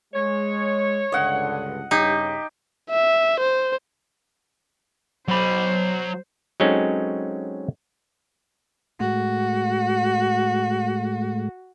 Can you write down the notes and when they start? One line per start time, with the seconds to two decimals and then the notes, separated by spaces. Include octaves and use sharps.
0.14 G#3 C#5
1.12 C#2 G2 D3 D#5 F#5
1.91 G2 C#3 D#4 G4
2.90 E5
3.40 C5
5.28 F#3 C5 B5
6.60 F#3 G#3 C4 C#4 D#4 A4
9.00 A2 G#3 A3 F#4